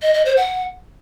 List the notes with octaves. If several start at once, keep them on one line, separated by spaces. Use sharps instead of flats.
D#5
D#5
C5
F#5